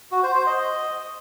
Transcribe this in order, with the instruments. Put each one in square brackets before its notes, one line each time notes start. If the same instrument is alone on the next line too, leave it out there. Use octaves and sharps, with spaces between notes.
[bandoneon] F#4
C5
C5
D#5